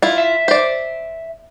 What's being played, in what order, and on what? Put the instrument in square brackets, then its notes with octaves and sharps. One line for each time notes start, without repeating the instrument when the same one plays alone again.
[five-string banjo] E4 F4
[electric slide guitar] E5
[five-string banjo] C5 D5